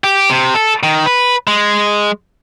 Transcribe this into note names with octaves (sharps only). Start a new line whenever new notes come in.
G4
C3
A4
D#3
B4
G#3